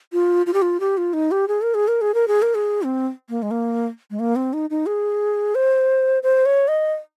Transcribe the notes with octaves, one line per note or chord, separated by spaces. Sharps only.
F4
F4
G4
F4
G4
F4
D#4
G4
G#4
A#4
G#4
A#4
G#4
A#4
G#4
A#4
G#4
C4
A#3
G#3
A#3
G#3
A#3
C4
D#4
D#4
G#4
C5
C5
C#5
D#5